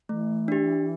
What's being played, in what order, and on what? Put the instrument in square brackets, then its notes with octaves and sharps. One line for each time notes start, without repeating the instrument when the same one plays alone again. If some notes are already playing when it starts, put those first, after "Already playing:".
[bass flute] E3 [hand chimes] A3
[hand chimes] D4 G4